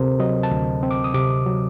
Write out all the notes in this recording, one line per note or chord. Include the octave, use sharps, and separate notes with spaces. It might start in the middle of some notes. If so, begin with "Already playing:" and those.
Already playing: D2 C3 C4 A4 A#4 C5
F#3 D#5
A5
D2
C4
D6
D#6
C3 D6
F#3